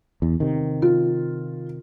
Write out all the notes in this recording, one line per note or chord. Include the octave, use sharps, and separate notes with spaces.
E2
C3 D#3
F4